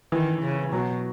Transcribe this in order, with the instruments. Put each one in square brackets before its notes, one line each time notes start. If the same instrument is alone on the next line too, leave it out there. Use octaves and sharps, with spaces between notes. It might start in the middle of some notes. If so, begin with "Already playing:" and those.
[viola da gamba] D#3 [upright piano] E3
[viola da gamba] C#3
[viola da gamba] B2 [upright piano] F#3